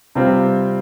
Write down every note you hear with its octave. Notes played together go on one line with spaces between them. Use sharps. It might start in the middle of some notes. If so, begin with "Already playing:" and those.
C3 G3 C4 F4